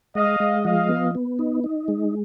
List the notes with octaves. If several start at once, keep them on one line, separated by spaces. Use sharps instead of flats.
G#3 D#5 F5
G#3
F3 D#5 F5
B3
B3
D#4
D#4
G#3